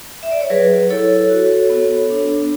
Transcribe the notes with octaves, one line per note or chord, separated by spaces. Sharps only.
E5
D5
C#5
F#3 G#4 B4
E4 A4 C#5
F#4
B3
D4